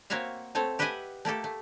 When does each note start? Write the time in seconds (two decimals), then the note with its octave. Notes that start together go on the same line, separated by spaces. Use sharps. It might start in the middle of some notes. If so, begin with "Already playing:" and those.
0.10 A#3 C4 F#4 C#5 E5 F5
0.55 A3 C4 A4 C#5
0.79 G4 B4 D#5 E5 F#5 G#5
1.25 A3 A#3 G4 A4
1.44 A3